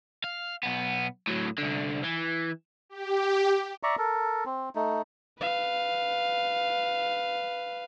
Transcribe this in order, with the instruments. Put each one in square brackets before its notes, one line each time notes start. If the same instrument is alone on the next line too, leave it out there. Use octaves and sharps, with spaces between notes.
[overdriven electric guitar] F5
B1 B3
A2 F#3
C2 D3
E3
[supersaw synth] G4
[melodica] D5 E5 A#5 C#6
A4 A#4
C4
A3 D#4
[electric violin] B4 F5